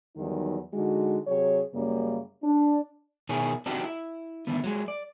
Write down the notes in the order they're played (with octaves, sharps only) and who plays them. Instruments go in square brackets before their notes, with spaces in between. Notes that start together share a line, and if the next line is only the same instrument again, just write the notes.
[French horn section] E2 D#3 F#3 G3 D#4
D3 G#3 D#4 F#4
C3 F#3 G#4 C#5
F#2 C#3 G3 A#3
D4
[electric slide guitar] B2 D#3 E4 G#4 C#5
C4 D4 D#4 F#4 G4
E4
D3 D#3 A3 B3
F#3 G#3
D5